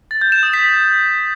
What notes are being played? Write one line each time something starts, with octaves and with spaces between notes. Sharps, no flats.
A6
G6
E7
D#6
B6